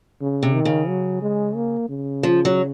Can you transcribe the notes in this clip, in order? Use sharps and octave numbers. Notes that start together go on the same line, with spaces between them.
C#3
C3
D#3
C#3
F#3
G#3
A#3
C#3
F3
F#3